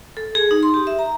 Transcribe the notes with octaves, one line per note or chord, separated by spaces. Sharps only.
A4
G#4
D#4
C6
G4
E5
A#5